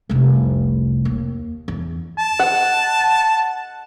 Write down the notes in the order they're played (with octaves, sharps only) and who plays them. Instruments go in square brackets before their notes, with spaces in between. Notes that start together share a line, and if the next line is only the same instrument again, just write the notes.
[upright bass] F1 C2
D#2
E2
[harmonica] A5
[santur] F#5